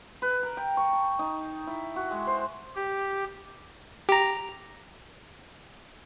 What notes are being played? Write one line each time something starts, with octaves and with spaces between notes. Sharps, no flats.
B4
A#4
G5
C#6
A5
D#4
E4
F#4
G#3
C5
G4
G4 A#5